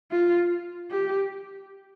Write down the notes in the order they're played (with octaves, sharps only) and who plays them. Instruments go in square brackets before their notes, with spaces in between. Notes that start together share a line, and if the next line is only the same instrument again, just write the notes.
[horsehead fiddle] F4
G4